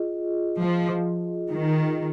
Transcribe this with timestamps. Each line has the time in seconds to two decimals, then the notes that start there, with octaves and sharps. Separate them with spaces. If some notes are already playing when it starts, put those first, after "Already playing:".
Already playing: F4 G#4 D#5
0.60 F3
1.50 D#3